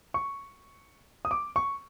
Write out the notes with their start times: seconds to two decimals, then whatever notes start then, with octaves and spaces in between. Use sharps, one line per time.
0.14 C#6
1.25 D#6
1.31 D6
1.56 C#6